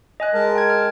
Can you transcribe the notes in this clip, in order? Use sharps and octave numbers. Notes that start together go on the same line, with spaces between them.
D#5 G#5 F#6
G#3 A#4 A5
G5 G#6
F6